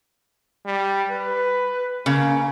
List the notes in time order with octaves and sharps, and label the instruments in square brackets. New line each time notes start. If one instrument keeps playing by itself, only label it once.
[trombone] G3
B4
[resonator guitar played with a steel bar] C#3 [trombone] A#3